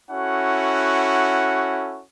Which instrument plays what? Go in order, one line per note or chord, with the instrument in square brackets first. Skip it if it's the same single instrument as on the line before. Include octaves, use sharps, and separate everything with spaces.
[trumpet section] C#4 E4 F#4 A4 F#5